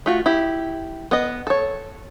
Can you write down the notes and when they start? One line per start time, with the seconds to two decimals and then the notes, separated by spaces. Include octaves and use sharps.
0.06 A3 F4 F#4
0.26 E4 G4
1.11 B3 D#5
1.47 A4 C#5